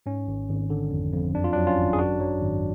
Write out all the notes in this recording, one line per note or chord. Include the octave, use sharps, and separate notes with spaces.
G#2 C#4
G#1
G#1
D3
F2
F2
F#2 D4
F4
F#3 D4
C#4 F4
G#1
G#4
F#2 D4 F#4
F#3
G#1